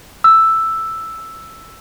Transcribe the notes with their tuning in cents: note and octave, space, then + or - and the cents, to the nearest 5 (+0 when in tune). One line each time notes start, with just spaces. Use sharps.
E6 +0